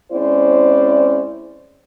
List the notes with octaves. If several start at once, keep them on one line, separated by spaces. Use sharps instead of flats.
G#3 C4 C#4 E4 C5 D5